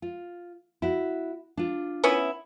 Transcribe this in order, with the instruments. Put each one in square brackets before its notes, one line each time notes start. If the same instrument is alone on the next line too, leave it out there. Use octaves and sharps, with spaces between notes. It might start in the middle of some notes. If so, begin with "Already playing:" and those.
[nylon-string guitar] F4
E4 F#4
D4 F4
[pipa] B3 C#4 E4